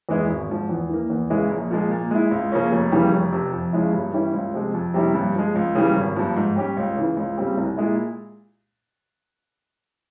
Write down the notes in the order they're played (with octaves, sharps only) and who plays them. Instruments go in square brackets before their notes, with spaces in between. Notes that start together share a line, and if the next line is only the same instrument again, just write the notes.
[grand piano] E2 E3 G#3 E4
G#1
G#2 F3
E2
E3 A#3
E2
C#3 E3 G#3 E4
A#1
A#2 F3 G#3
A#2
G#3 E4
C#2
C#3 F3 A#3 C#4
F1
F2 C#3 E3 G3
F1
F2 C3
F2
C#3 F3 G#3 E4
G2
E3 G3 C#4 E4
C#2
C3 F3 G#3
F2
C3 G3 C#4 E4
G2
F3 G#3
C#2
C#3 E3 G3
G#1
G2 F3
G#2
G3 C#4 G4
C#2
C#3 E3
C#2
C#3 G3 C4 G4
C2
A#2 G#3 E4